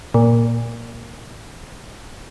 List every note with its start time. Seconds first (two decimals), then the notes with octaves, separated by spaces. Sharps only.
0.14 A#2